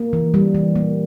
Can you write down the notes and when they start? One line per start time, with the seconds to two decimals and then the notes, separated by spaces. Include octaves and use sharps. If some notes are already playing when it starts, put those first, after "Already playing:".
Already playing: A#3
0.13 E3
0.34 G3
0.55 E3
0.76 A#3